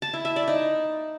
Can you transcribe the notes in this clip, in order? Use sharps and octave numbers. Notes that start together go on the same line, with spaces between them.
A5
E4
E5
D5
D#4